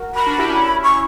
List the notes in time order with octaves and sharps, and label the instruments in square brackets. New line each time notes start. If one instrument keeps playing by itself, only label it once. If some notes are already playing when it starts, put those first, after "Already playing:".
Already playing: [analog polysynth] F#4 A#4
[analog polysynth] F#4 A#4 [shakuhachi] B5
[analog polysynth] D4 F#4
E4 G4
C#4 E4
[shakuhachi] C#6